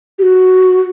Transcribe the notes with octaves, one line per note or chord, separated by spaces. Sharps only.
G4
F#4